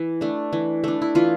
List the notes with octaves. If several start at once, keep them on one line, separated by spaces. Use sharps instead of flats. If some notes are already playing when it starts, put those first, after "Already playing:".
Already playing: E3
A3 D4
E3
A3 D4
E4
E3 F4